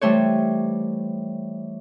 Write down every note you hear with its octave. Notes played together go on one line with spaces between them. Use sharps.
E3 G3 A3 C5 C#5